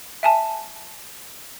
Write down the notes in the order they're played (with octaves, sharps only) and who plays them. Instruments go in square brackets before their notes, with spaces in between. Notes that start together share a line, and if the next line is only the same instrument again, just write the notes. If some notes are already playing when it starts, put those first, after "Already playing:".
[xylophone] E5 G#5 A5